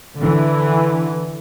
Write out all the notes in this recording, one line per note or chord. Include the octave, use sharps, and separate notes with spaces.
D3 E3